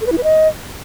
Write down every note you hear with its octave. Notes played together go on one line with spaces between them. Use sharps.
A4
B4
E4
B4
D#5